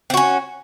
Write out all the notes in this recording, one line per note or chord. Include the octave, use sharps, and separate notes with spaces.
C4 C#4 F#4